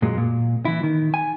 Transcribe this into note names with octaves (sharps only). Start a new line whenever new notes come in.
F#2 A#2 F#3 G#3
A#2
E3 E4
D#3
G#5